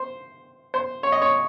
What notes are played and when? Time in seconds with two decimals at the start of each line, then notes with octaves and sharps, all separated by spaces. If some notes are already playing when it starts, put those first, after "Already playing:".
Already playing: C5
0.74 C5
1.03 C#5
1.12 D#5
1.22 C#5